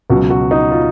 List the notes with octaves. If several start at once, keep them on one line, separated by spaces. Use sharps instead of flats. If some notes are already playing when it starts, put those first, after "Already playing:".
C#2 B2 F#3 F#4
F#4
D#4
F4